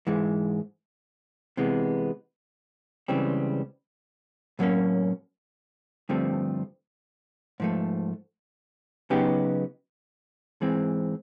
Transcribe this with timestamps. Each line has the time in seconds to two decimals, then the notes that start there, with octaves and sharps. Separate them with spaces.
0.07 G#2 E3 G#3
1.57 C3 E3 G#3 B3
3.08 C#2 C#3 E3 G3 C4
4.59 A2 F#3 A#3 C#4
6.09 G2 D3 F3 A3 C4
7.60 G#2 F3 A3
9.10 C#3 F#3 B3 D#4 G4
10.61 G#2 E3 G#3 C4